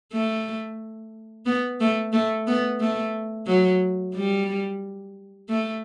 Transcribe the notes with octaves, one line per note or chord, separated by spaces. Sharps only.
A3
B3
A3
A3
B3
A3
F#3
G3
A3